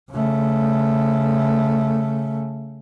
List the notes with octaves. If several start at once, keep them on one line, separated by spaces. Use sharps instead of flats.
C#3 A3